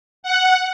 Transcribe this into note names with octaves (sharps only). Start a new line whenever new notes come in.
F#5